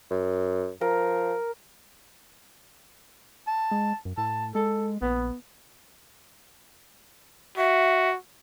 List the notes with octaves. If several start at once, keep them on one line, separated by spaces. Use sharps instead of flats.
F#2
F3 A#4
A5
G#3
F#2
A2 A5
G#3 A4
A#1 B3
F#4 E5